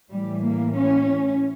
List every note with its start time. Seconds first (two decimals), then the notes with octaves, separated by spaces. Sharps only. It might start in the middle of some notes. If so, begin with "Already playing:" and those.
0.11 A2 E3 G3
0.43 A#3
0.75 C#4